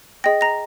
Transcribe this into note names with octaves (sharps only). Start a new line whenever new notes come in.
G#4 D#5 G5 A#6
A#5 A#6